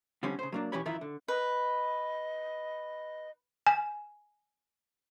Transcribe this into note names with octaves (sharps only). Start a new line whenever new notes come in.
D3 G3 C4 C#4
C#3 C5
F#3 A#3 D4
B1 E3 C#4 G4 C#5 B5
F#2 D#3 E3 E4 F4 E5
D3
B4 D#5
G#5